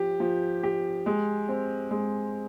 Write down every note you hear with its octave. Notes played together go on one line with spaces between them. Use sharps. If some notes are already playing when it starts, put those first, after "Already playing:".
Already playing: F3 G4
F3
G4
G#3
C4
G#3